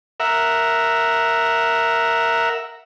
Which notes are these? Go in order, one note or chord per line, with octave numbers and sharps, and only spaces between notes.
A#4 E5 F#5